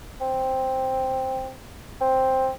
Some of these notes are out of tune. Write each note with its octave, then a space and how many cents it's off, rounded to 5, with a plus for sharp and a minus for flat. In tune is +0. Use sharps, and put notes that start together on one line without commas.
C4 +5
C4 +5